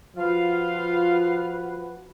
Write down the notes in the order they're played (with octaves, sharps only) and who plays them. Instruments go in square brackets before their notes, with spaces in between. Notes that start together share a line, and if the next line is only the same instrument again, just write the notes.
[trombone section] F3 F#4 B4 [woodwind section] F4 F5